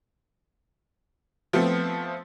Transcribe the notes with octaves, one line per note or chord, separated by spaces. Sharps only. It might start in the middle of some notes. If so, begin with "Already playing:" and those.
F3 A3 B3 C4